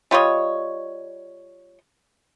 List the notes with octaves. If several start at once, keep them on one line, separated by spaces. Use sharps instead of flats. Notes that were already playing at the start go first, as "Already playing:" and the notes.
G3 F4 C#5 D#5